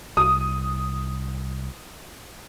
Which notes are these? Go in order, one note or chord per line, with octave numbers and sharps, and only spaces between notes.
C2 D#6